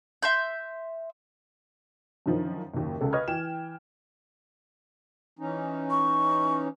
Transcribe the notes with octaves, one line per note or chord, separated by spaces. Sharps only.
E5 C6 G6
F#2 D3 D#3 F3
F#1 D#2
C#2 C#3 A4
B4 D#5 C#6 D#6 F6 G#6
E3 G5 E7
E3 C#4 D#4
C#6